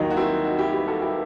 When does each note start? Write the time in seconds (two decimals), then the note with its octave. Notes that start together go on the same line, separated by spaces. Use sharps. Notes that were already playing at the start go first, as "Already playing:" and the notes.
Already playing: D#2 D#3 F#3 D#4
0.10 F#4
0.16 C4 E4
0.44 D#4 F#4
0.58 E4 G4
0.73 G4 B4
0.87 F#4 A4
1.01 E4 G4